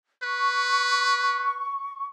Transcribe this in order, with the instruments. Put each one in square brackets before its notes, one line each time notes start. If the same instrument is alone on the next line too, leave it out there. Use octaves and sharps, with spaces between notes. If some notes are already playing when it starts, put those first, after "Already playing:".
[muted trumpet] B4 [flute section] C#6